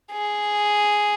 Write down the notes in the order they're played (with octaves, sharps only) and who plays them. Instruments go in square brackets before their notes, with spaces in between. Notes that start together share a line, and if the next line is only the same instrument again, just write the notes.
[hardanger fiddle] G#4